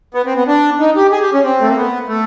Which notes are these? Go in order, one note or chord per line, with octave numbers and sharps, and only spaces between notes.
B3
C4
B3
D4
D#4
G4
G#4
G4
C#4
C4
A3
A#3
B3
A3